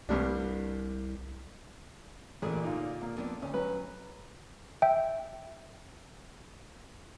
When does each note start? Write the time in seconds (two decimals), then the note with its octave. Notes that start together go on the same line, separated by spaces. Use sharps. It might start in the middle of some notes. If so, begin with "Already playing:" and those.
0.09 C2 G2 C3 D4
2.42 A1 A#2 D3 G#4
2.64 D#4 F4
3.02 A#3
3.17 F2 B3 D4
3.42 D2 C#4
3.54 F#3 B4
4.82 E5 G5